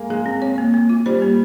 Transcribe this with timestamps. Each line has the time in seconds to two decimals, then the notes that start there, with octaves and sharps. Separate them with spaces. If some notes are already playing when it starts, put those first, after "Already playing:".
Already playing: G#3 A#3
0.10 G#3 G#4
0.26 C4
0.42 C#5
0.58 A#3
0.74 A#3
0.89 F4
1.06 G3 C5
1.22 A#3